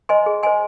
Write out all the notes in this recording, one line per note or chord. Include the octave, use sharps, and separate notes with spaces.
C5 D#5 G#5 C6
G#4
C5 D#5 G#5 C6